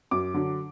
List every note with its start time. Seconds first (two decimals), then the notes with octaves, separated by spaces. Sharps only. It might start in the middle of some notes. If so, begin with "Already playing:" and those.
0.11 F#2 D6
0.34 D3 F#3